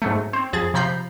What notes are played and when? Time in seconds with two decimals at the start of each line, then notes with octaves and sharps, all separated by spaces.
0.02 G#2 F#3 A3
0.33 C4
0.53 F2 G#4 A6
0.74 C3 F3 A#5 B5 G6 C7